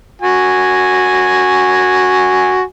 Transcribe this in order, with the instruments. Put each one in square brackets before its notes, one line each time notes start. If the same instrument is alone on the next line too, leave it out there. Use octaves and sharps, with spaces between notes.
[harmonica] F#4 G#5